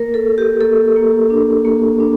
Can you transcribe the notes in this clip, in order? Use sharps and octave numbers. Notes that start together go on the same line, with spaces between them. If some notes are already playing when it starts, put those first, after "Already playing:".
Already playing: A#3 A#4
A4
A#3
G4
A#3 A4
A#3
D4
A#3
D4